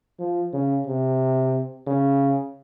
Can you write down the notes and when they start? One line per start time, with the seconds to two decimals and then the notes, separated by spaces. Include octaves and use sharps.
0.19 F3
0.53 C#3
0.87 C3
1.87 C#3